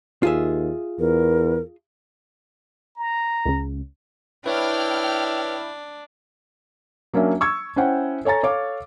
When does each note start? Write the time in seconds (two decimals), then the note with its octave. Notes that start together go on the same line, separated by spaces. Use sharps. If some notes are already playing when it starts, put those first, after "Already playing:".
0.23 D#2 F4 G#4 E5
1.00 E2 A#4
2.97 A#5
3.45 C#2 C#3
4.46 D4 E4 B4 C#5 G5 F6
7.14 F#3 A#3 C#4 D4 E5
7.41 C#6 E6 G#6
7.76 C#4 E4 C5 F#5 G5
8.25 A4 C#5 G#5 A#5 A6
8.43 A4 C#5 F5 D6